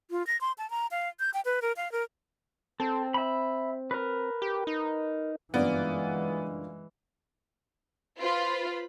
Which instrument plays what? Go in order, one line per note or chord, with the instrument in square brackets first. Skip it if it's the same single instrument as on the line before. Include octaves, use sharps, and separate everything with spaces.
[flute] F4
A#6
C6
A5
A#5
F5
G6
G5
B4
A#4
F5
A#4
[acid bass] C4 [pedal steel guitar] A4
[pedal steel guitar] E5 B5
A#4 B4
[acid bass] G4
D#4
[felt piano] F#1 G2 [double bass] E3 G#3 [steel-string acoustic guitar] A#3 F4 D5 [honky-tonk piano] B3
[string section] F4 [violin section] B4 C5 B5